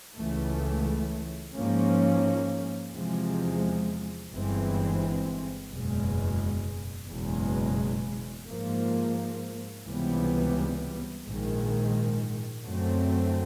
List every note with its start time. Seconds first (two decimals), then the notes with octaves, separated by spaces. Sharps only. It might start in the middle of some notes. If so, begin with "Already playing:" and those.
0.16 C#2 C#3 E3 A3
1.55 G#2 F3 A#3 C#4
2.93 E2 C3 F3 G#3
4.31 G1 G2 E3 G#3 C4
5.70 F#1 E2 B2 G#3
7.09 F#1 E2 B2 G#3
8.47 G#2 F3 A#3
9.85 C#2 C3 E3 G3 B3
11.24 A#1 G#2 D#3 G#3
12.64 F#2 D3 F#3 A3 C4